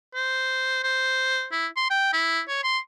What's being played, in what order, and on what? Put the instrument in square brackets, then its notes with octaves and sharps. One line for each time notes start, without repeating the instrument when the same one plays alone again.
[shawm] C5
C5
E4
C6
G5
E4
C#5
C6